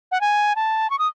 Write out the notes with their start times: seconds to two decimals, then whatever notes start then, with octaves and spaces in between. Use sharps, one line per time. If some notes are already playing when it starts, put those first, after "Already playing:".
0.12 F#5
0.21 G#5
0.56 A5
0.90 C#6
0.99 D#6